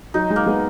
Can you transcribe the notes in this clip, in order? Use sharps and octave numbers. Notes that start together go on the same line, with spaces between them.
F#3 D#4
G#3
A#3
G#3 B3